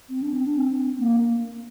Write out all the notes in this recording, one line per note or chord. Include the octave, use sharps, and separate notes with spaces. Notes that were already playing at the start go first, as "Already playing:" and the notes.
C4
D4
C4
D4
C4
A#3